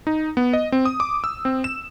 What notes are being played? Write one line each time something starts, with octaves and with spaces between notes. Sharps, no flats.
D#4
B3
D#5
C4
D#6
D6
E6
C4
E7